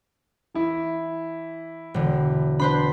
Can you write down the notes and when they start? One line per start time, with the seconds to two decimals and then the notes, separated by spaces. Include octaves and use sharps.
0.54 E3 E4
1.94 E1 D3
2.59 D4 B4 C5 B5